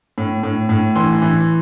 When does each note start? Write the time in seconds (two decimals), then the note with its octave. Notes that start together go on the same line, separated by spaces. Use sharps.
0.18 A2
0.43 A2
0.69 A2
0.96 E3 C6
1.22 E3